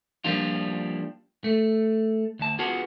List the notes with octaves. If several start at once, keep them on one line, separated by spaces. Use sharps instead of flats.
F3 G3 A#3 D4 F4
A3
D2 A5
B3 F4 F#4 G#4